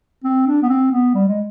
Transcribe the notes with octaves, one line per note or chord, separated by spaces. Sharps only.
C4
D4
B3
C4
B3
G3
G#3